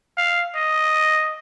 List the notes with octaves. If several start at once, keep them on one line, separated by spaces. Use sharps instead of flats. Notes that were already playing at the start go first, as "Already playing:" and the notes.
F5
D#5